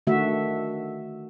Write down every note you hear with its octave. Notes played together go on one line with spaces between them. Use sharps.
D3 D#3 A3 F#4 E5